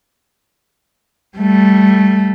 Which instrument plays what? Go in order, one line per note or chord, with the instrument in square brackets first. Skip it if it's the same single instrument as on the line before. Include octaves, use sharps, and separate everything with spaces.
[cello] G3 A3